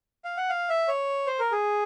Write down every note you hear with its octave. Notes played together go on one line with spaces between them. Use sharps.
F5
F#5
F5
E5
C#5
C5
A#4
G#4